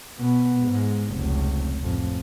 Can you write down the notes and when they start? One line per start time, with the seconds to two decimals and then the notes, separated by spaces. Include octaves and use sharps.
0.19 B2 B3
0.62 G#2 G#3
1.14 F1 C#2
1.83 A1 F2